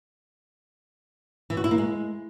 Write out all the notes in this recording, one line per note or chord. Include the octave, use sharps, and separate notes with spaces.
E3
F#4
E4
A#3
G#3